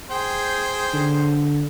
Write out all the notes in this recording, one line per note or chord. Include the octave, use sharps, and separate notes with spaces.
G#4 C5 G5
D3